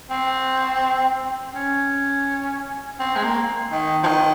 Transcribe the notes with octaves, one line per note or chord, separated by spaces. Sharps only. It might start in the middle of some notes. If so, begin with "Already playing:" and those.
C4
C#4
C4
G#3
A#3
D#3
F3
D#3